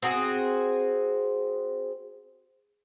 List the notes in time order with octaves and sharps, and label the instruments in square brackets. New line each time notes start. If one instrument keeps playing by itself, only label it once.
[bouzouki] C4 F#4 G#4